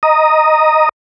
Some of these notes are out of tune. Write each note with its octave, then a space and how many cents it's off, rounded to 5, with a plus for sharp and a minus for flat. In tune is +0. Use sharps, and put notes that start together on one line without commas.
D#5 +0 A#5 +0 D#6 +0